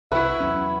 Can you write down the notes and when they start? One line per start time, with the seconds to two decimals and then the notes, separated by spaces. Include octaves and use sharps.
0.12 C2 E4 F#4 B4 E5
0.40 E2 F#3 C#4